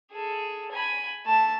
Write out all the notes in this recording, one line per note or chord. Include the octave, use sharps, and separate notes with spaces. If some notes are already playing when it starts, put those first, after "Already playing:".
G#4 A4
G#5 B5
A3 A5